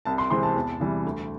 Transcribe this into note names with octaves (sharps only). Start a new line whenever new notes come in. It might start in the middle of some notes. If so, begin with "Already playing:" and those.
C2 A5
C6
C3 E3 G#3 C4 C6
A5
E2
C3 E3 G3
D2